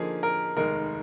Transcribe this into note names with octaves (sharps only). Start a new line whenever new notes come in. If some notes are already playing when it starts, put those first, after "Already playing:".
Already playing: D3 F3 A#3 D#4 G#4
A#4
F1 D#2 D#3 G#3 D#4 A#4